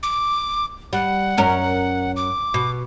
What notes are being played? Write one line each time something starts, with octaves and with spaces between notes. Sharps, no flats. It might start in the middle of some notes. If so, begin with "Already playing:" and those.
D6
G3 F#5
F#2 C#4 A#4
D6
B2